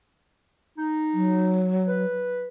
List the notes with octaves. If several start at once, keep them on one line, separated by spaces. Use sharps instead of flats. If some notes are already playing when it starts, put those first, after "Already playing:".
D#4
F#3
B4